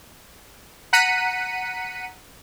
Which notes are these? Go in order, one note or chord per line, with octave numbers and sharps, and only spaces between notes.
F#5 A#5 F#6 B6 C#7 D#7